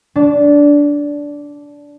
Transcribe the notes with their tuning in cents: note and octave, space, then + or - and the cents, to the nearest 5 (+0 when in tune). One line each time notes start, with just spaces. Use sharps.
D4 -15